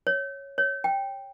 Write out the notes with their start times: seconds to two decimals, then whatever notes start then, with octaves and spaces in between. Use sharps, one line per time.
0.07 C#5
0.58 C#5
0.84 G5